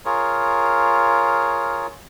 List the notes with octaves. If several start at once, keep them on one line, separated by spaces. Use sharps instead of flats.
F4 G#4 A#4 C#5